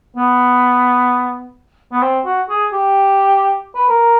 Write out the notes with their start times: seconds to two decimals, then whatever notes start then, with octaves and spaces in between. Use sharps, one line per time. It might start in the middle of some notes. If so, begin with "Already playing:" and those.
0.17 B3
1.93 B3
2.03 C4
2.25 F#4
2.50 G#4
2.73 G4
3.75 B4
3.89 A#4